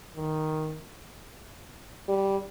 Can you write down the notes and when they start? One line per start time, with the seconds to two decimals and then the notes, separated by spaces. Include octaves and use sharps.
0.16 D#3
2.09 G3